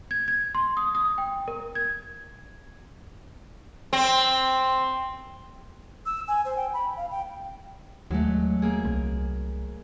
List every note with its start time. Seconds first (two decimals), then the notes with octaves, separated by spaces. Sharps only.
0.11 G#6
0.28 G#6
0.55 C6
0.77 D#6
0.95 D#6
1.18 G5
1.48 A#4
1.75 G#6
3.93 C4
6.06 E6
6.28 G#5
6.45 C5
6.57 G5
6.73 B5
6.97 F5
7.11 G5
8.11 D#2 F#3 G#3 A3
8.62 A#3 G#4
8.85 C2